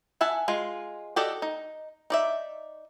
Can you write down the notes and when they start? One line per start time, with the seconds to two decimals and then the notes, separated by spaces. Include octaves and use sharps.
0.21 E5 F#5 G#5 A5
0.48 G#3 F4
1.16 F#4 G4 A4 D5 D#5
1.42 D#4
2.10 D#4 D5 E5